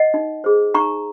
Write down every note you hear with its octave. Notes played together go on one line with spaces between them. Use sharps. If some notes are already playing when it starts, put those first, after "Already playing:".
Already playing: D#5 F#5
D#4
G#4 C5
D#4 A#5 C#6